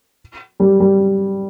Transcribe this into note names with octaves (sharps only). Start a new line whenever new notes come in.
G3
G3